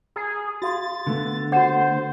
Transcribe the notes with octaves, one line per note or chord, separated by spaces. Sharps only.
G#4 A#5
F#4 F5 C6 A6
D3 A3 B3
F#4 C5 F#5